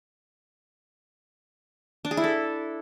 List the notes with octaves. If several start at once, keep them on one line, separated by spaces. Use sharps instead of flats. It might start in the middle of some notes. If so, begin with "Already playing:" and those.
D4
G#4
E4
A4